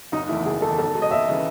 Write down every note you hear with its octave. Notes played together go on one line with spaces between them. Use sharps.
F#1 D#4
E2 D#3 A3 E4
F#1 G#4
E2 D#3 A4
B1 A4
B2 G#3
D#5
D#2 E5
C#3 E3 G#3